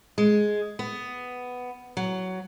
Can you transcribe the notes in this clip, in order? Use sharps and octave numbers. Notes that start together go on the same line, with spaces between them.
G#3
B3
F#3